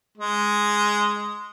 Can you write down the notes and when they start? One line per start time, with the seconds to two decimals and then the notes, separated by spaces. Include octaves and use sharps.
0.18 G#3